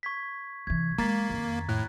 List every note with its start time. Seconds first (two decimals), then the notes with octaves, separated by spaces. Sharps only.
0.03 C#6 G#6 B6
0.67 C3 E3 G#6
0.98 G#3 A#3 A#5 A6 B6
1.30 F2 D#3
1.69 A2 F#6